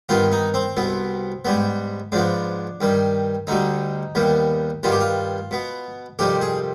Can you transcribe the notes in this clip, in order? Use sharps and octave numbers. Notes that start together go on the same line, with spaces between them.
G2 D#3 B3 F4
D#4
C4
C2 B2 B3
G#2 G3 B3
G#2 F3 B3 D4
G2 D#3 G3
D2 D3 G3 D#4
D#2 D#3 G3 B3
G2 D#3 G3 B3 F4
G4
F4
B2 B3
F2 C3 D#3 G3 G4
G#4